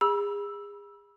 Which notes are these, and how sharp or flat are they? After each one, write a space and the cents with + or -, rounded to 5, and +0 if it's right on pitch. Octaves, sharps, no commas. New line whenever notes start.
G#4 -30 B5 -35 E6 +0